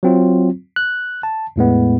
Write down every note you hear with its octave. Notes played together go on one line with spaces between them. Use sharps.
F#3 C4 F4
F#6
A5
E2 A2 G#3 B3